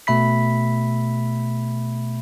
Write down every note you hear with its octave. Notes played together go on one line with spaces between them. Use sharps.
B2 A3 E5 B5 B6